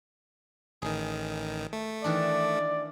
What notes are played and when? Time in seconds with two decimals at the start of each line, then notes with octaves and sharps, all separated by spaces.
0.82 A1 D#3 G#4
1.73 A3
2.04 D#3 E3 D4 D5